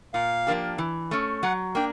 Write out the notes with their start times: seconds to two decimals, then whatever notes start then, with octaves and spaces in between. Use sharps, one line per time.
0.14 A#2 F5
0.47 F3 A#3 D4 G4
0.78 E3
1.11 A3 C#4
1.43 F#3 F#5
1.75 A#3 D4 G5